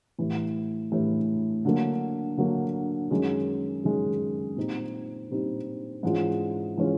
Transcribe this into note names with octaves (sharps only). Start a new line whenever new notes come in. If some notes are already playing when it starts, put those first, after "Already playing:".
A2 E3 G3
A2 E3 G3
D3 F#3 A#3
D3 F#3 A#3
F#2 D#3 G#3 C#4
F#2 D#3 G#3 C#4
A#2 G3 C4 D#4
A#2 G3 C4 D#4
G#2 E3 G#3 C#4 F4
E3 G#3 C#4 F4